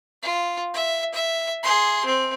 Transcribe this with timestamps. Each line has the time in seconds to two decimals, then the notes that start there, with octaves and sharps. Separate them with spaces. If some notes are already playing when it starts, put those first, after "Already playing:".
0.22 F4
0.73 E5
1.14 E5
1.63 G#4 C6
2.05 C4